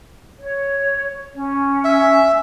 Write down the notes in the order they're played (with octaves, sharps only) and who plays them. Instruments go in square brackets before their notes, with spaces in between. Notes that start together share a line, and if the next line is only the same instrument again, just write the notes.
[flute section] C#5
C#4
[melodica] E5